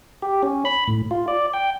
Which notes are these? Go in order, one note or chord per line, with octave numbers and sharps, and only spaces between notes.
G4
C#4
B5
A2
F4
D5
G5